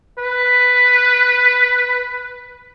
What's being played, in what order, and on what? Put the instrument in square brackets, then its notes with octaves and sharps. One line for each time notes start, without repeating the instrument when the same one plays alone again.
[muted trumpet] B4